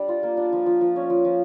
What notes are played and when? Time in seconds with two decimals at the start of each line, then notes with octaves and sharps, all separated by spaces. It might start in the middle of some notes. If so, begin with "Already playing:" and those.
Already playing: G3 D4
0.09 F4
0.23 A#3
0.37 D4
0.53 F3
0.66 F3
0.81 F3
0.96 C#4
1.10 F3
1.25 F3